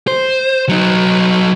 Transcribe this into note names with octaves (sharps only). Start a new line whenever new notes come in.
C5
F#3 D#4